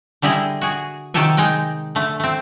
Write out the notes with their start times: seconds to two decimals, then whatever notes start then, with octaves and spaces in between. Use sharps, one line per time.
0.22 D3 G3 E4 G#4 D#5
0.61 F#4 G#4
1.14 C3 D#3 F#3 G4 A4 G#5
1.37 G#3 D#4 G5
1.95 D3 A3
2.20 A3 C4